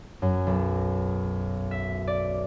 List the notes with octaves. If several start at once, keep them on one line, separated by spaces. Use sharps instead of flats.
F#2
B1
E5
D5